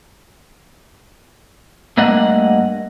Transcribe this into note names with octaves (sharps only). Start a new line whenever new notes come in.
G2 A3 A#3 D#5 F#5